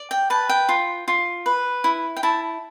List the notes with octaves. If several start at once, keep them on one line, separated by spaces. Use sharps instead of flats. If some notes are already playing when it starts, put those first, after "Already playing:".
Already playing: D5
G5
B4 A5
G5
F4
F4
B4
E4
G5
E4 A5